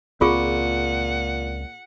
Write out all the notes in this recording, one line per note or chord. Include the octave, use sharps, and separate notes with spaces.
C#2 A#2 C4 F4 G#4 F#5 C#6